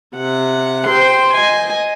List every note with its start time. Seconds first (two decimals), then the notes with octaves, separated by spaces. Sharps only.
0.17 C3 F#5
0.87 C5 G5 C6
1.33 D#5 G#5